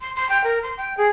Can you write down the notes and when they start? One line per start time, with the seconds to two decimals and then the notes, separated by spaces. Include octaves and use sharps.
0.01 C6
0.16 C6
0.29 G5
0.44 A#4
0.63 C6
0.78 G5
0.97 G#4